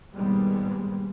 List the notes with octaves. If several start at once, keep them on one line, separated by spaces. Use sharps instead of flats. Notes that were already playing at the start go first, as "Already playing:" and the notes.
D#2 G#2 B2 G3 G#3